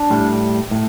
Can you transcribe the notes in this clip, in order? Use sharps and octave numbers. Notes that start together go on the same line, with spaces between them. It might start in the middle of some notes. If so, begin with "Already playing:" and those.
Already playing: D4
A2 G3
A2